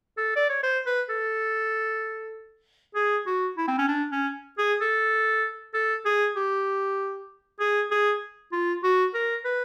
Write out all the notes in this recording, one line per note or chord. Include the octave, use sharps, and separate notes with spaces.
A4
D5
C#5
C5
B4
A4
G#4
F#4
E4
C4
C#4
D4
C#4
G#4
A4
A4
G#4
G4
G#4
G#4
F4
F#4
A#4
B4